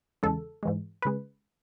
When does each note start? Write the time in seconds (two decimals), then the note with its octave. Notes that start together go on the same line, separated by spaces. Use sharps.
0.23 E2 C#3 G#3 A4
0.63 G#2 E3 G#3
1.02 C#3 G#3 B4